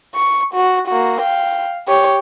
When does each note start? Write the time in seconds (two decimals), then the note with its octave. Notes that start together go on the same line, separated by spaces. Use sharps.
0.15 C#6
0.54 F#4
0.87 A#3 F#4
1.21 F5 G5
1.88 G4 C#5